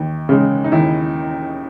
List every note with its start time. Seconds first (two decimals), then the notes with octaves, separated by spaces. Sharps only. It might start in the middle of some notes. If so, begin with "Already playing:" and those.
Already playing: D#2
0.29 C#3 G#3
0.64 D#4
0.72 D#2 E4